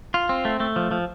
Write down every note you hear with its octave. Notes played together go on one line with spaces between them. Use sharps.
F4
C4
A3
A3
F3
F3